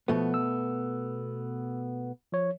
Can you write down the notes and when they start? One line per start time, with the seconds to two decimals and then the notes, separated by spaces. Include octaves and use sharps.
0.08 B2 F3 A3 B3
0.34 E6
2.33 F3 C#5